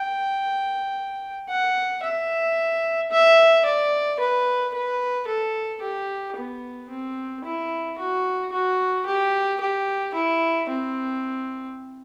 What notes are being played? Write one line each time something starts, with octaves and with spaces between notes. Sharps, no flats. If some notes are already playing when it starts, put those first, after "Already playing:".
Already playing: G5
F#5
E5
E5
D5
B4
B4
A4
G4
B3
C4
E4
F#4
F#4
G4
G4
E4
C4